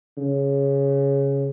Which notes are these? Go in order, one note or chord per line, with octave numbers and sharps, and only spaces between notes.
C#3